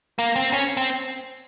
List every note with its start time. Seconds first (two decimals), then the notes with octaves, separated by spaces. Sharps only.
0.19 A#3
0.36 C4
0.53 C#4
0.77 C4